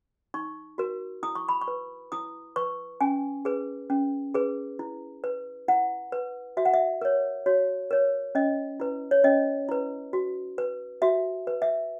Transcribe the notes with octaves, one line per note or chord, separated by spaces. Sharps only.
D#4 C#6
F#4 A#4
E4 D#6
C#6
B5
C#6
B4
E4 D#6
B4 C#6
C#4 G#5
G#4 B4
C#4
G#4 B4
E4
B4
E4 F#5
B4
F#4 E5
F#5
E5
A#4 C#5
F#4 C#5
A#4 C#5
C#4 D#5
E4 B4
C#5
C#4 D#5
E4 B4
F#4
B4
F#4 E5
B4
E5